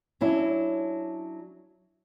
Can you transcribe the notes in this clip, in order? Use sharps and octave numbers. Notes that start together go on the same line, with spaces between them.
F#3 C#4 D4 E4